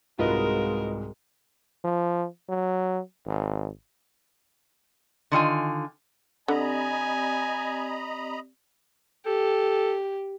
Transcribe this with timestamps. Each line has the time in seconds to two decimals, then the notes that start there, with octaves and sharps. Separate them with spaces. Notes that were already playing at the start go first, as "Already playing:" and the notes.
0.19 C2 G#2 G#3 F4 F#4 A#4 B4 D#5
1.84 F3
2.49 F#3
3.26 G#1
5.32 D3 D#3 F4 G#5
6.48 D3 C4 G4 D5 D#5 G#5 A#5 B5
9.26 G4 A4